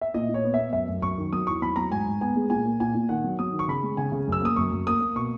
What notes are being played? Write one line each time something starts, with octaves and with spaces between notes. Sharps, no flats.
E5
A#2 D#5
A#2
C#5
B3
E5
B3
F#2 E5
F#2
F#2 C#6
D#3
F#3 D#6
E2 C#6
F#3 B5
F#3 A#5
G#2 G#5
G#2
B3 G#5
G#3
A#2 G#5
A#3
A#2 G#5
A#2
D#3 F#5
F#3
F#3 D#6
D#3
C#6
C#3 B5
G#3
C#3 G#5
C#3
F#2 E6
A#3 D#6
F#2 C#6
F#2
A#3 D#6
A#3
B2 C#6